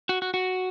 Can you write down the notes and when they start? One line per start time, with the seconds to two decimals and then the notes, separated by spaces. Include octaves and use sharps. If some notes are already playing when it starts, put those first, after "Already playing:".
0.09 F#4
0.22 F#4
0.34 F#4